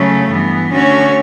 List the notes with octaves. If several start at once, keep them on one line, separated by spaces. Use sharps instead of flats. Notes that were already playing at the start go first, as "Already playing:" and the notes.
Already playing: C#3 F#3 A3 C#4
G2 E3 B3
D3 A3 C#4 F#4 C#5